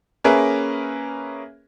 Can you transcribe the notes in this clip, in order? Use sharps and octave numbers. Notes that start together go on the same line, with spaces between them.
A#3 C#4 G#4 A#4 B4 E5